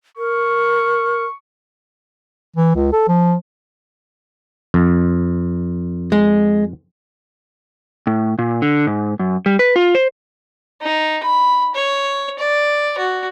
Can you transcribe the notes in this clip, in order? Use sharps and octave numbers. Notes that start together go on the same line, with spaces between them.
A#4 C#6
E3
C#2
A4
F3
F2
G#3
A2
A#2
D3
G#2
F#2
G3
B4
F4
C5
D#4
B5
C#5
D5
F#4